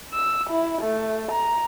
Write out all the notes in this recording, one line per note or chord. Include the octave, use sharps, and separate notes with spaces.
E6
E4
A3
A#5